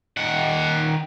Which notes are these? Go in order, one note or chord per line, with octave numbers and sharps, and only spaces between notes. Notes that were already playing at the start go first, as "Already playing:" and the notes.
D#3 F#5